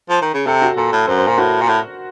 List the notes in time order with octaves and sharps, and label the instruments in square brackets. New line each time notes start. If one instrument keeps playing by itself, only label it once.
[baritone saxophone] F3
D#3
C#3
[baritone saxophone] C3 [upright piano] A4
[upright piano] F#4
[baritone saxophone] A#2 [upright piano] A4
[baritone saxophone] A2
[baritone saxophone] F#2 [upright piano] C5
[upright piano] C5
[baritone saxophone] A#2 [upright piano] A#4
[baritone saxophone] A2 [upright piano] F#4
[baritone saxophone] A#2
A2